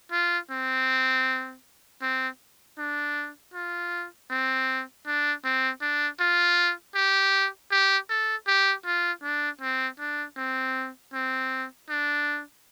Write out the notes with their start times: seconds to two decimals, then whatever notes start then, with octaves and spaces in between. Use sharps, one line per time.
0.12 F4
0.51 C4
2.02 C4
2.78 D4
3.54 F4
4.31 C4
5.06 D4
5.44 C4
5.81 D4
6.20 F4
6.95 G4
7.71 G4
8.09 A4
8.47 G4
8.85 F4
9.23 D4
9.61 C4
9.99 D4
10.37 C4
11.14 C4
11.89 D4